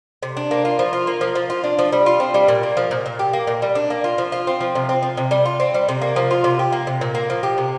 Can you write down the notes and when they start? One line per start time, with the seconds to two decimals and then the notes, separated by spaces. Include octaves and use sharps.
0.23 C3
0.37 D4
0.51 A#3
0.65 F4
0.79 F3
0.93 F4
1.07 A#3
1.21 F3
1.35 F3
1.50 F4
1.64 D4
1.79 F3
1.92 G3
2.06 F4
2.20 C4
2.34 G3
2.48 A#2
2.63 A#3
2.77 F3
2.91 A#2
3.06 A#2
3.19 G4
3.33 A#3
3.47 A#2
3.62 G3
3.75 D4
3.90 A#3
4.04 F4
4.18 F3
4.32 F4
4.47 C4
4.61 F3
4.75 C3
4.89 C4
5.03 F3
5.17 C3
5.31 G3
5.45 F4
5.60 C4
5.74 G3
5.89 C3
6.02 A#3
6.16 F3
6.31 F4
6.44 C3
6.59 G4
6.72 A#3
6.87 C3
7.01 A#2
7.15 A#3
7.30 F3
7.43 G4
7.58 C3